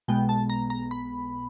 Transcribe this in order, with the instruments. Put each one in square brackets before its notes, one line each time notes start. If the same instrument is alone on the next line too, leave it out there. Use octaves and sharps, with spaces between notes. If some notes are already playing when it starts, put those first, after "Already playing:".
[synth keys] B1 B2 G#3 B3 G5
A5
A#5
A#5
B5